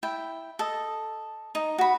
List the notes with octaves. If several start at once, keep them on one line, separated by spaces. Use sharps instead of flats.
E4 G5
A4 D#5
D#4
F#4 B5